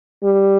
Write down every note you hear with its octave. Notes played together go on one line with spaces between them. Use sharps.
G3